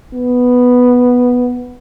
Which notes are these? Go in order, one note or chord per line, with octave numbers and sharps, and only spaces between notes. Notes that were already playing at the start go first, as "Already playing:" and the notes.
B3